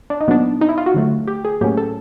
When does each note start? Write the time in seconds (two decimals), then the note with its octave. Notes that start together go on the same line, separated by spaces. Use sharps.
0.10 D4
0.21 D#4
0.27 A#2 F#3 B3 D4
0.61 D#4
0.69 E4
0.78 F4
0.86 F#4
0.94 D3 F#3 A3
1.28 G4
1.45 G#4
1.61 A2 F#3 A#3 C#4 G4
1.77 A4